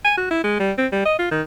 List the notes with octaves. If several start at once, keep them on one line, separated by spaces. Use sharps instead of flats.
G#5
F#4
E4
G#3
G3
C4
G3
D#5
F4
D#3